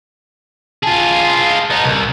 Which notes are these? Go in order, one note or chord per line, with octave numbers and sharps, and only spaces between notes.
F4 G#4 A5
B3 D#4
C2